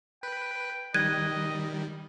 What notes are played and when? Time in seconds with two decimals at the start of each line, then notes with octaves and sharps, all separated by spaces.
0.23 B4 G5
0.94 D#3 G3 D#5 F#6 G#6 D#7